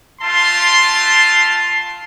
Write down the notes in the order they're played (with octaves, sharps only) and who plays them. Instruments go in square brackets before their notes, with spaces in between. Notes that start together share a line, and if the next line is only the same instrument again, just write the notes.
[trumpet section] A3 F4 A5 C6